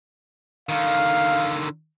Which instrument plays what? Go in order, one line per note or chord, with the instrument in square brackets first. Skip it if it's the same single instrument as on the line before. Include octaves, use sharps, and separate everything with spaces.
[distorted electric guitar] D3 D#3 [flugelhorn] F5